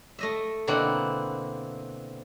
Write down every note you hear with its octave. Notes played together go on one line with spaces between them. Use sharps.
A3 D#5 E5
B2 D3 A#3 C4 E4 F#5